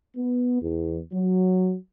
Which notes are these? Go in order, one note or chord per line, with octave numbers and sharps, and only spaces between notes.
B3
E2
F#3